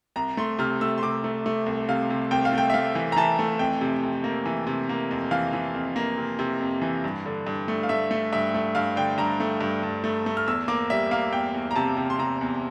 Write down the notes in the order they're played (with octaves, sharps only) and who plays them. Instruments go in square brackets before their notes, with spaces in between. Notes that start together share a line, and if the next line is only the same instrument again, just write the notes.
[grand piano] C2 A#5
A3 C6
C3 F6
A3 E6
C6
C3 D6
A3
A3
C2
C3 F5
C3
C2 G5
F5
A3
G5
E5
A3 F5
E3
A#5
E3 A5
A3
F2 G5
C3
F2
A#3
E3
C3
A#3
F2
E3 F5
E3
F2
A#3
C3
C3
F2
E3
G2
D3
G2
A3
F5
A3 E5
A3
G2 E5
A3
G2 F5
D3 G5
G2 A#5
A3
G2
G2
A3
A3
F6
E2 E6
A#3 D6
G3 E5
A#3 F5
E2 G5
E2
A#5
C3 A5
C3
C6
C3 A#5
E2